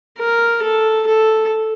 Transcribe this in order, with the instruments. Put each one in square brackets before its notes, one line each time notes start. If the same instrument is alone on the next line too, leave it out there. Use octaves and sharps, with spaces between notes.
[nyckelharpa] A#4
A4
A4